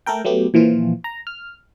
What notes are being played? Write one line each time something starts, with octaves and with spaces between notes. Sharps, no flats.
A3 A4 A#4 G5
F#3 A3 B3 G4
A#2 E3 F3 F4
A#5
F6